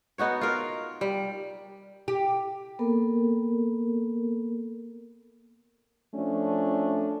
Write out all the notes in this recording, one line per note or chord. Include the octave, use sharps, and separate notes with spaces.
B3 D#4 F#4 C#5
F4 A#4
G3
G4
A#3 B3 A4 A#4
F3 A3 C#4 D4